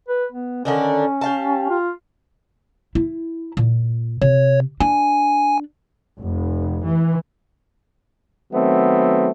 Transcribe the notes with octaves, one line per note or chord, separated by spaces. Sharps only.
B4
B3
D3 D#3 C#4 D4
G4 F5 A5
F4
E4
A#2
C3 C#5
D4 G#5
F1
E3
D#3 F#3 A3 B3 C4